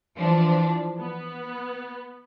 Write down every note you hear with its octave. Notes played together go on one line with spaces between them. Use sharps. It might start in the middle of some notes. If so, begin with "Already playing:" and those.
E3 F3 D4
B3